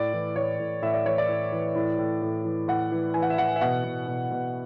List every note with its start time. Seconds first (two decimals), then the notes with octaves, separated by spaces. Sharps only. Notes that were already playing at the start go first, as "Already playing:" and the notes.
Already playing: A2 D5
0.13 E3
0.35 A2 C#5
0.59 A2
0.82 A2 E5
0.94 D5
1.05 E3 C#5
1.18 D5
1.29 A2
1.52 E3
1.75 A2
1.98 A2
2.22 A2
2.45 E3
2.68 A2 F#5
2.92 E3
3.14 E3 G#5
3.22 F#5
3.30 E5
3.38 E3 F#5
3.56 E5
3.61 B2 F#5
3.84 B2
4.08 B2
4.31 B2